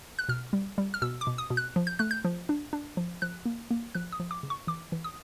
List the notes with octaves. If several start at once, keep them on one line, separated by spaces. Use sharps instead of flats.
F#6
B2 F6
G3
G3
F6
B2 E6
D6
B2
D#6
B2
F#6
F3
G6
A3 F#6
G6
F3
D4
D4
F3
F3 F#6
A#3
A#3
F3 F#6
D#6
F3
D6
C#3
C#6
E3 D6
E3
D#6